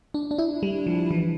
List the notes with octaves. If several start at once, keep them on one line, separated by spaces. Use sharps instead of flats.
D4
D4
E4
G3
F3
E3